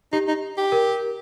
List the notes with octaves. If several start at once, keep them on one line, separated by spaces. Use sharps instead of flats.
D#4 G4
D#4
G4
A#4